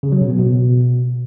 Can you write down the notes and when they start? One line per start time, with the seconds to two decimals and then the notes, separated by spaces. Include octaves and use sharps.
0.03 C#3
0.12 F#3
0.21 B2
0.30 B3
0.39 B2